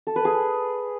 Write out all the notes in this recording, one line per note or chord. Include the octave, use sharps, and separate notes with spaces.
A4
B4
G#4